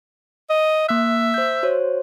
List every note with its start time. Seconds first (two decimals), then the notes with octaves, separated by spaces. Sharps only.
0.50 D#5
0.88 A#3 E5 F#6
1.34 C5 G6
1.63 F#4 C5 C#5